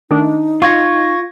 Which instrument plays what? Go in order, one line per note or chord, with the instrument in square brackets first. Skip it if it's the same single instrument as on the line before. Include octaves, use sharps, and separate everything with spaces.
[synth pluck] D#3 A3 D4 [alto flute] D#4
[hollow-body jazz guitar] F4 [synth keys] C#6 G#6 A#6